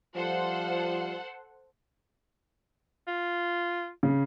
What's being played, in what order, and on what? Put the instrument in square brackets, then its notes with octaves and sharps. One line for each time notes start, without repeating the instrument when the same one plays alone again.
[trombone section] F3 G3 F4 [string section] A4 C5 F#5
[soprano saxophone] F4
[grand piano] C#3